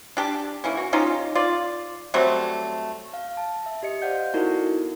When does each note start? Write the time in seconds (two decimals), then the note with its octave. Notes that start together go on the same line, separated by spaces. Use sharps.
0.17 D4 G4 A5
0.64 E3 A#3 C#4
0.77 F#4
0.93 C#4 D#4 F4 G4
1.35 F4 D5
2.14 F#3 G3 A3 C4
3.14 F5
3.37 A5
3.66 E5
3.83 G4 D#5 C#7
4.02 C5 D5 F5 F#5 G6
4.34 B3 D#4 E4 F#4 A4 A#4